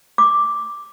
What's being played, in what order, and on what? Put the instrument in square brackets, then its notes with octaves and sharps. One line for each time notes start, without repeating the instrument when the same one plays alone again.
[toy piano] D6